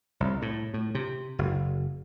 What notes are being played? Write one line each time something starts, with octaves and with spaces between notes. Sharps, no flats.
C2
A2
A2
C3
F#1